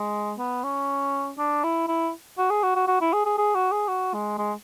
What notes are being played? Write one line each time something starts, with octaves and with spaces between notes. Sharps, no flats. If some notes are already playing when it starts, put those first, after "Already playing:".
Already playing: G#3
B3
C#4
D4
E4
E4
F#4
G#4
F#4
F#4
F#4
E4
G#4
G#4
G#4
F#4
G#4
F#4
G#3
G#3